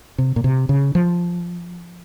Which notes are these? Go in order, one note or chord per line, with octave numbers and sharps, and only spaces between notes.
C3
A#2
C3
C#3
F3